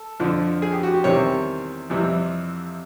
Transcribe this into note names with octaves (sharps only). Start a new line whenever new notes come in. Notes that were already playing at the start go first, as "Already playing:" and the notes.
Already playing: A4
F2 D3 F3
G#4
G4
F#4
G4
E2 C3 D#3 G3 C4 C#5
F2 C3 E3 G3